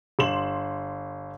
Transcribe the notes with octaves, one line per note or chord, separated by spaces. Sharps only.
G1 C6 E7 F#7